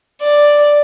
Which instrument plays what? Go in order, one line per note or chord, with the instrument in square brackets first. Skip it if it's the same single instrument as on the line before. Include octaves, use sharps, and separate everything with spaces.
[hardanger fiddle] D5